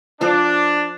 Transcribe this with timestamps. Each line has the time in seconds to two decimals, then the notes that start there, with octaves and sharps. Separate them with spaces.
0.21 F3 D4 A4 C5